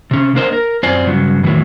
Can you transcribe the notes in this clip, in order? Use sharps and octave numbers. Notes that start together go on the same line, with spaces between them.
C3 C#4
A#3 D4 A#4 C5 D#5
A#4
F#2 C4 F4 C5 D5 G#5
G2 C#3 F#3
E2 A2 D#3 E3 F#3